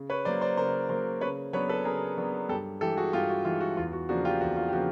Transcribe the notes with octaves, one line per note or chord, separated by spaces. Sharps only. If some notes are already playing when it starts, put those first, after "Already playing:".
Already playing: C#3
B4 C#5
F#3 A#3 C5 D5
C5 D5
C#3 A#4 C5
F#3 A#3 A#4 C5
C#3 B4 C#5
F#3 B3 D4 B4 C#5
A4 B4
C#3 G#4 A#4
F#3 B3 D4
G2 G4 A4
E3 G#3 G4 A4
F#4 G#4
G2 F4 G4
F#4
E3 G#3 F4
F#4
E2 F4
F#4
C#3 F3 A#3 D4 F#4
F4 G4
E2 F#4
F4
G4
C#3 F3 A#3 D4 F#4